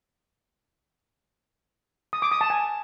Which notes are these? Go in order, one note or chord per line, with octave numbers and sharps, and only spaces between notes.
D#6
D6
D#6
A5
G#5